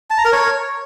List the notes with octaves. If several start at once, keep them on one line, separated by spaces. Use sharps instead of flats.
A5
A#5
A#4
C#5